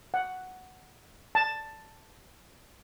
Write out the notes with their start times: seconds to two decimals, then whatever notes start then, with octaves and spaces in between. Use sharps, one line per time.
0.14 F#5
1.35 A5